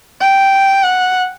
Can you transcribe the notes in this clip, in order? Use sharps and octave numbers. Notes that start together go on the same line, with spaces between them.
G5
F#5